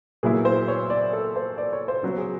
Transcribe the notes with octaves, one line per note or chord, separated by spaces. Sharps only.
A#2 F#3 B3 E4 G#4
C5
C#5
D5
A4
C5
D5
C#5
C5
C#3 F#3 B3
G#4